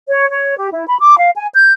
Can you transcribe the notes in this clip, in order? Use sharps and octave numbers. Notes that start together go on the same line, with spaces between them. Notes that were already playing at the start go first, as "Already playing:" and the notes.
C#5
C#5
G4
E4
B5
D6
F5
G#5
G6